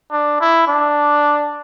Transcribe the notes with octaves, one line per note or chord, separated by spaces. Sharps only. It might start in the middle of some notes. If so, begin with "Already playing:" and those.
D4
E4
D4